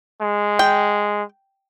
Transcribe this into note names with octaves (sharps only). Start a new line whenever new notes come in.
G#3
G5